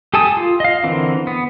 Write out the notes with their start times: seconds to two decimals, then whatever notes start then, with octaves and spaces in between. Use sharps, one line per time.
0.14 G4 A4 G#5 A5 D#6
0.37 F4
0.60 D#5 F5
0.84 D3 E3 C4 A#4
1.27 B3